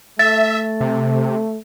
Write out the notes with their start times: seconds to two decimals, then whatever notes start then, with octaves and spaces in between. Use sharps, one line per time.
0.19 A3 E5 A6
0.81 C3